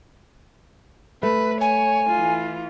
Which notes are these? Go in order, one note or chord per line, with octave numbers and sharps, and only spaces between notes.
A3 B4
C#5 G#5
E3 F4